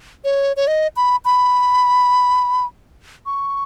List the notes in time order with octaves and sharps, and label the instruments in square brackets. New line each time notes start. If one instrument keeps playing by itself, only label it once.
[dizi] C#5
C#5
D#5
B5
B5
C#6